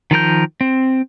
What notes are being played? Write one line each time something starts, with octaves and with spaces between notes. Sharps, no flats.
D#3 F3 A#4 G6
C4